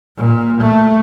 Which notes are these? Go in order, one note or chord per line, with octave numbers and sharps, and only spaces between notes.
A#2
A3